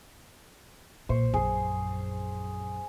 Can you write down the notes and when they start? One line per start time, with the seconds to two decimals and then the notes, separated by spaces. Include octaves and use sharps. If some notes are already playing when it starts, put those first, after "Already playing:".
1.09 B1 A#2 C5 C#6 E6
1.34 A#1 F#2 G#4